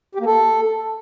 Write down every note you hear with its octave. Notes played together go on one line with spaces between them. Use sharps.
G4
A#3
A4